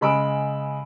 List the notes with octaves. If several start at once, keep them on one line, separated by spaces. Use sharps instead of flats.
C#3 G#3 B5 E6 D7